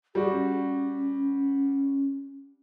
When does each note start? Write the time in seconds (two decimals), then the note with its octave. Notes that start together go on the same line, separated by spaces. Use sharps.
0.15 G3 F#4 G#4
0.32 C#4